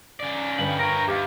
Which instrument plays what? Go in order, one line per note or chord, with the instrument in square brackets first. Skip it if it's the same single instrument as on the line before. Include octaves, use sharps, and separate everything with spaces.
[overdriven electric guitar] C#3 D5
[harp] G1 B4 G5 [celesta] F#7
[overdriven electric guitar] A#4 C#5 [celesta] A#6 D7
[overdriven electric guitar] D#2 [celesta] G4 D6 [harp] E5 F5